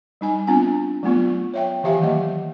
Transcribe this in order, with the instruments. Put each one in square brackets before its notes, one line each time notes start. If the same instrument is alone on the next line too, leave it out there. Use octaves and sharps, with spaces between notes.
[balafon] G3 D#4 G#5
B3 C4 D4 F4 G#5
F#3 A3 B3 F4
C#5 E5 G5
D#3 E3 G4 E5 F5 G#5
F#3 A#3 D#5